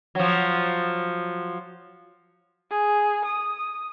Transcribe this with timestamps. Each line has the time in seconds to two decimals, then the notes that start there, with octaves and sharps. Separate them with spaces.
0.15 F3 F#3
2.71 G#4
3.25 D#6